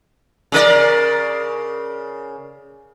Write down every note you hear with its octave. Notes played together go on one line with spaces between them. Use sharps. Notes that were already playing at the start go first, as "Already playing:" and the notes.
C#3 A#4 D5